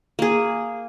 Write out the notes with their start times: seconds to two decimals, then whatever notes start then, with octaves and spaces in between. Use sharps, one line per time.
0.19 A#3 G#4